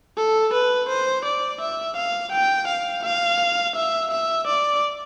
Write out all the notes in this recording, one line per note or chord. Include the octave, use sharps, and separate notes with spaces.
A4
B4
C5
D5
E5
F5
G5
F5
F5
E5
E5
D5